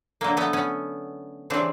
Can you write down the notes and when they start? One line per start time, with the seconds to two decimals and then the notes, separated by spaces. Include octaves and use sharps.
0.21 D3 F#3 A3 A#3
0.37 A3 B3
0.53 B3 C#4
1.50 C#3 E3 G3 C4 D4